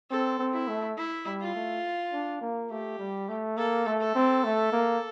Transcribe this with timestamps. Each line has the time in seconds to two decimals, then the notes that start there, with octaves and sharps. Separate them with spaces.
0.11 C4 A4
0.39 C4
0.53 E4
0.68 A3
0.97 E4
1.26 G3
1.40 F4
1.55 A3
2.13 D4
2.41 A#3
2.71 A3 G4
2.99 G3
3.29 A3
3.57 A#3 A4
3.87 A3
4.01 A4
4.15 C4
4.44 A3
4.72 A#3